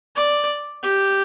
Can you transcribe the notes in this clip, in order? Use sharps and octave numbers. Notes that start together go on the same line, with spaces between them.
D5
G4